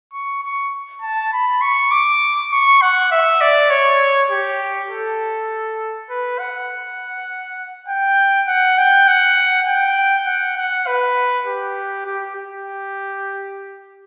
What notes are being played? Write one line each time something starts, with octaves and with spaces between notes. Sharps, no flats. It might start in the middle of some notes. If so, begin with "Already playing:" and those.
C#6
C#6
A5
B5
C#6
D6
C#6
F#5
E5
D5
C#5
G4
A4
B4
F#5
G5
F#5
G5
F#5
G5
F#5
F#5
B4
G4
G4
G4